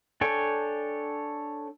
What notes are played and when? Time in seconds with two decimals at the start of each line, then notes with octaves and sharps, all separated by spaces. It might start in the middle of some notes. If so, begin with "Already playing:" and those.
0.21 D4 A4 C#5 G5 G#5